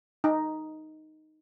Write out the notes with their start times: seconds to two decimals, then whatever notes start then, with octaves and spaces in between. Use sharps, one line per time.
0.24 D#4